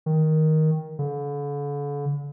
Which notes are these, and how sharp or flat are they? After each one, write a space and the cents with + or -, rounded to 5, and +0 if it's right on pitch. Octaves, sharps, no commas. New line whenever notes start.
D#3 +10
D3 -40